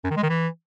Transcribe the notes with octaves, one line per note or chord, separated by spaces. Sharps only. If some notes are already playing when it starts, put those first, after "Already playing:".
F#2
D#3
G#3
D#3
E3